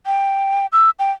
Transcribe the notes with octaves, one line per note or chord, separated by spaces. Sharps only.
G5
E6
G5